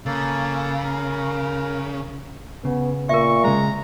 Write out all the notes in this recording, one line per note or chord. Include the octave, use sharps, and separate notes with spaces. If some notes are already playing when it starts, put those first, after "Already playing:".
C#3 A#3 A4
A#4
C#3 B3
A#2 A#4 E5 C#6
C#3 G#3 A#5